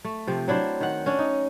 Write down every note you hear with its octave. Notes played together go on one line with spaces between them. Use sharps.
A3
C3 F3 C4
F#3 D4 E4 C5
D#3 F#5
C#4 D4
D#4